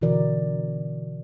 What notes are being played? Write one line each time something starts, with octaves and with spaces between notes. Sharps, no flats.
B2 D3 E3 F#4 A#4 D5